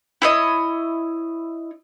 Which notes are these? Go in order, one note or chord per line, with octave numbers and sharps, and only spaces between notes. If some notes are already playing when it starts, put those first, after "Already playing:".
E4 C#5 D#5